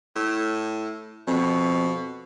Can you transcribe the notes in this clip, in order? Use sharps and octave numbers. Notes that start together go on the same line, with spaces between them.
A2
F2 B2